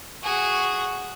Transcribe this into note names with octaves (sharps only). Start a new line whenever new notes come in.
F#4 G#4